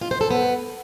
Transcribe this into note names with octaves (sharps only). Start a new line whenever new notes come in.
F4
C5
A4
B3